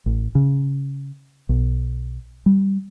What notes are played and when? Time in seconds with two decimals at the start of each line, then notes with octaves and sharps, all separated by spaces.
0.06 A1
0.35 C#3
1.49 B1
2.46 G3